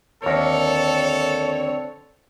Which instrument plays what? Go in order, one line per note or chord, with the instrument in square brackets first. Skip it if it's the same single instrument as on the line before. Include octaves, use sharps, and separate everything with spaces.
[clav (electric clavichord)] D#2 A#4 [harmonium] D3 C4 [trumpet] A4 [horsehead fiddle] C#5